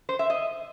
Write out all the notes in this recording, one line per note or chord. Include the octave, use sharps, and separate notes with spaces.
C5
E5
D#5